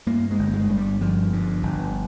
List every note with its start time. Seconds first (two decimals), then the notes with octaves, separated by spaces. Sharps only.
0.07 G2 A#3
0.31 G#3
0.39 G1
0.54 G#3
0.69 G2
0.78 G3
1.00 G1 F3
1.33 G2
1.63 G1